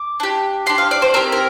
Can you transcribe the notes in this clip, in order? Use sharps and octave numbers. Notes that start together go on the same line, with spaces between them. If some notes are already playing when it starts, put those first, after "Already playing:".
Already playing: D6
D4 G4
D4 G4 C6
F5
D5
C5
C4 G4 A#4
A#4